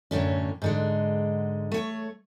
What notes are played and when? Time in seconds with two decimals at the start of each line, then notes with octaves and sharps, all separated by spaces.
0.11 F#2 A2 D3 C#4
0.62 G#2 D3 G#3
1.72 A3 C#5